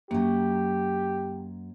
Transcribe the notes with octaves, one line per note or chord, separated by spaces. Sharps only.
F#2 F#3 A#3 G4